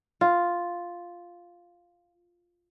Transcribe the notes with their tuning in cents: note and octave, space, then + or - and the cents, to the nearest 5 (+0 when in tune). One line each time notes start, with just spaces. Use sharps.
F4 +0